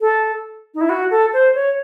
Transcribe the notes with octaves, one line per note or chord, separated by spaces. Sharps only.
A4
D#4
E4
F#4
A4
C5
C#5